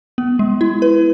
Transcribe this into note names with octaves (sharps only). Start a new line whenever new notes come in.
B3
G#3
E4
B4